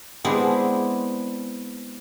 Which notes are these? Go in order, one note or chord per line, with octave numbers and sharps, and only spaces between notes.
G#3 B3 C4 D4 E4